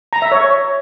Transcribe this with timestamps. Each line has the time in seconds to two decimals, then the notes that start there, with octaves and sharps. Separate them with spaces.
0.13 A#5
0.22 E5
0.32 C#5